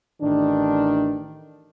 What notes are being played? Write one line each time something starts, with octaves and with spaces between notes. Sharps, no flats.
A1 D#3 D4